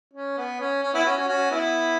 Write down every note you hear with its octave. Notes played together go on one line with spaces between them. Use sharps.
C#4
B3
C#4
C#4
B3 E4
C#4 F#4
C#4 F#4
C#4 F#4
B3 E4